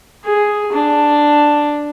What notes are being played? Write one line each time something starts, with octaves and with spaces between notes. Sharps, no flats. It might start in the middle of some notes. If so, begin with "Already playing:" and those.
G#4
D4